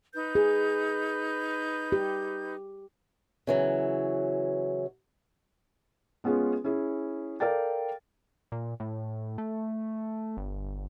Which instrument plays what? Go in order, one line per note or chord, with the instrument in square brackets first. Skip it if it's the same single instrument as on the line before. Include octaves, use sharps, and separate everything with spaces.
[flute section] D#4 B4 G6
[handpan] G#4
G4
[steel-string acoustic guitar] C#3 E3 F#3
[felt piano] G#3 B3 C#4 F4 G#4
C#4 E4 G#4
A4 A#4 D5 F5 G5 A6
[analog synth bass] A#2
A2
A3
G1